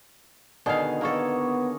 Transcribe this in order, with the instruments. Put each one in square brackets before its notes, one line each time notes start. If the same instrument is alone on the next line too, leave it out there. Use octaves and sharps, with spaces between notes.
[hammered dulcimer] B2 G#4 [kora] D3 D#3 F5
[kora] A#3 A4 [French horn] B3 [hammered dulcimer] A#4 C#5